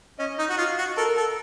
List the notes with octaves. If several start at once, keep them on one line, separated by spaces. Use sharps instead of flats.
C#4 D#5
D#4
F#4
F4
F#4
A4 A#4
A4